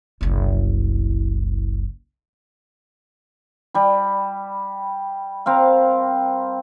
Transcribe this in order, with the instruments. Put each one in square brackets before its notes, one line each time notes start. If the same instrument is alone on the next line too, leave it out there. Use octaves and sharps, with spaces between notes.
[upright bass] F#1 C2
[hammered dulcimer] G3 B5
C4 A#4 F5